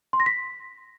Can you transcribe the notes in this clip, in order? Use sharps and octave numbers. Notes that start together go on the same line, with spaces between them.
C6
A#6
B6